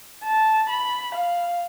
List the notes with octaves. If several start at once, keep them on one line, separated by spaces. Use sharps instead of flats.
A5
B5
F5